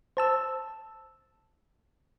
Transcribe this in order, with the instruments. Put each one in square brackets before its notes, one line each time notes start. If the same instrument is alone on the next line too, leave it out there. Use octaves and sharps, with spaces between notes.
[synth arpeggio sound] C5 A5 E6